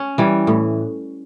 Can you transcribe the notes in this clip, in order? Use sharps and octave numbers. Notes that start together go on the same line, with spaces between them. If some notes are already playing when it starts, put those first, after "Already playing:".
Already playing: C#4
E3 G3
A2